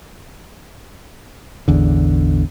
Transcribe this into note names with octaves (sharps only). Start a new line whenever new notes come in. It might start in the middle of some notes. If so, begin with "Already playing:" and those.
A1 E2 D3